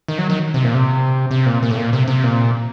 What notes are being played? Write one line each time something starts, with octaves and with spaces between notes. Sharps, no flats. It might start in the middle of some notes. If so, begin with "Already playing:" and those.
D#3
F#3
D#3
C3
A#2
C3
C3
A#2
A#2
A2
A#2
C3
C3
A#2